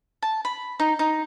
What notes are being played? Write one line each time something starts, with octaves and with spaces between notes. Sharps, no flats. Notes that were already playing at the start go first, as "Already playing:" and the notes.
A5
B5
D#4
D#4